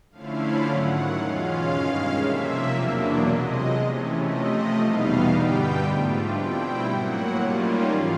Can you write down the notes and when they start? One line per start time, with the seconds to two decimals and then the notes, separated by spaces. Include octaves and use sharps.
0.11 D3 F3 A3 C#4 E4 F5
0.62 G#2 D#3 F#3 F#5
1.14 E2 B2 G#3 C#4 F4 F5
1.65 G2 D#3 G#3 C#4 F5
2.17 C3 F3 A#3 E5
2.69 E2 B2 F#3 A#3 D4
3.20 C3 F3 G#3 D#5
3.72 C3 E3 A3 C#4
4.24 C3 F3 A3 D#5
4.76 E2 B2 G3 B3 D#4 F5
5.27 G2 D3 G3 B3 G5
5.79 G#2 F3 A3 D4 F4
6.30 B2 G3 C4 E4 G5
6.82 A2 F#3 A#3 F#5
7.34 D#3 G3 A#3 C#4 F4
7.85 G#2 E3 G#3 F5